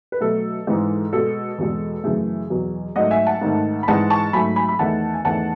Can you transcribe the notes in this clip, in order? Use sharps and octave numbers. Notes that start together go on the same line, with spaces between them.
B4
B2 F#3 A3 A4
G#2 E3 G#3
B2 G#3 A4
E2 B2 G#3
F#2 C#3 E3 A3 G#4
E2 B2 F#3
G#2 F#3 A3 D#5 F#5
E5 G#5
F#5 A5
G#2 D#3 A3
B5
G#2 E3 G#3 F#5 A5
A5 C#6
G#2 F#3 A3 G#5 B5
G#5 B5
B5
E2 D#3 A3 F#5 A5
G#5
E2 D#3 A3 F#5 A5